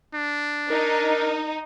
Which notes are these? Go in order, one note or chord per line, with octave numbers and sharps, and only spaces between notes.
D4
D#4 A#4